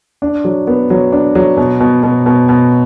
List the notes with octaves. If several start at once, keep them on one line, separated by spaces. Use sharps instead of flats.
D4
F#3
B3
F#3
D4
F#3
B2
B2
B2
B2
B2